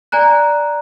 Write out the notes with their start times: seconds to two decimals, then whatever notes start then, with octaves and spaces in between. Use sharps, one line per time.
0.12 D5 G#5 A#5 F#6